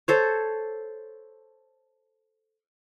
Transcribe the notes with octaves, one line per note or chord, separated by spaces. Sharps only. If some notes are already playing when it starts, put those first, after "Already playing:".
A4 C5 C#5